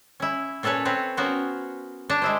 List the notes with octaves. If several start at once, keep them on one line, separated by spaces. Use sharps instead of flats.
C#4 E4
A#2 C#4 A4 B4 C#5
C4 B4 C#5
B3 C#4 F#4 A#4 C5
D4 C#5 A5 A#5
G#3 E4 C5